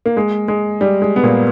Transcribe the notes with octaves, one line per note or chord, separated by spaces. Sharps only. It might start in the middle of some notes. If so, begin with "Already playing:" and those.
A#3
G#3
G#3
G3
G#3
B3
A#2 A#3